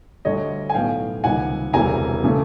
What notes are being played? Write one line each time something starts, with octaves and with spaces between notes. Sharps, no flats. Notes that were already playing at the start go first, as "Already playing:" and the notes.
D2 D3 G3 C#5 D#5
G#5
B1 A2 F#3 B3 F5 G5
C#2 C3 D#3 G3 A#3 F#5 G#5
E1 D2 C3 E3 G3 G#5 A#5
C#3 E3 A3